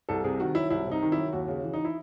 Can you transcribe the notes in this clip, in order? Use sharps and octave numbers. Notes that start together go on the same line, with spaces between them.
C2 A4
C3 G#4
D#3 F#4
F#3 E4
C2 E4
C3 D#4
D#3
E4
F#3
D#2 F#4
C#3
E3
D#4
E4